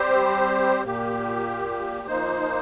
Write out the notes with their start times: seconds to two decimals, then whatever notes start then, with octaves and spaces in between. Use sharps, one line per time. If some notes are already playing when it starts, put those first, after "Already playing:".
Already playing: G3 C4 G4 C5
0.84 A#2 A#3 G4
2.07 F3 A#3 D#4 C5